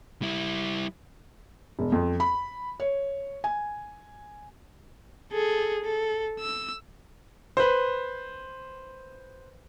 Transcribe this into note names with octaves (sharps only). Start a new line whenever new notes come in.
G3 E4
E1
F2
B5
C#5
G#5
G#4 A4
A4
E6
B4 C5